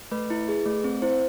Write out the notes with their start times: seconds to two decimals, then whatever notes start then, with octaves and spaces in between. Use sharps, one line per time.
0.12 A3 B4
0.30 E4
0.48 G#4
0.66 A3
0.84 C4
1.02 E4 C5